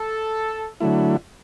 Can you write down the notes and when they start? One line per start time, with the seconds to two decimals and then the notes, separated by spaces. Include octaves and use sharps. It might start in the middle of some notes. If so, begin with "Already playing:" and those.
Already playing: A4
0.80 D3 F#3 A3 E4